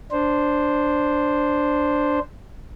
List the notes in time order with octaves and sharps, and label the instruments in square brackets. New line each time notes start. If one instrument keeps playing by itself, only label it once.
[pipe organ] D4 C5